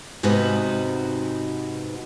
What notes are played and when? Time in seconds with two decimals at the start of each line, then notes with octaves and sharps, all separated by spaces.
0.23 G#2 C3 B3 D#4 F#4 B4